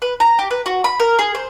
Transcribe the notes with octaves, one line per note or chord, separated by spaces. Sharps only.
B4
A#5
G4
B4
F#4
B5
A#4
G#4
C5